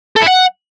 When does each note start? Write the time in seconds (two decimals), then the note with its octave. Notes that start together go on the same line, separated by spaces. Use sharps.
0.16 A4
0.22 E4
0.28 F#5